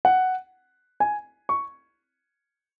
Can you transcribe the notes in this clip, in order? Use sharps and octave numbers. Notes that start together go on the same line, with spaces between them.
F#5
G#5
C#6